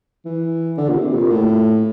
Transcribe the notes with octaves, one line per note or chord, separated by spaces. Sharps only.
E3
D3
A#2
C3
A#2
A2